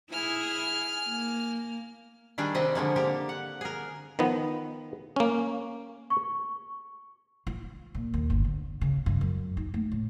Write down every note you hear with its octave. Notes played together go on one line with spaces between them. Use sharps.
E4 G#4 G#5 F6
A#3
D#3 G3 D4 G#4
C3 C4 D#5 E5
D3 F3 G#3 A#3
D3 A#3 G4
F#5
G#4 A#4
D#3 F3 B3
A#3 C#4
C#6
F4
A#2
D#2
G1
D3
C#3
G2
F#2
D#4
A3
A2